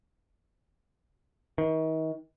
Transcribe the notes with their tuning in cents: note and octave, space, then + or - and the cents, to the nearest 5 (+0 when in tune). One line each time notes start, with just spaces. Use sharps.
D#3 +40